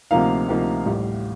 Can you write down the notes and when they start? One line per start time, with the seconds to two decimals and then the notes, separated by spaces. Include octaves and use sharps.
0.11 D2 C3 F3 A#3 D#4 F5
0.48 D2 C3 F3 A#3 D#4
0.86 A1 A2 G3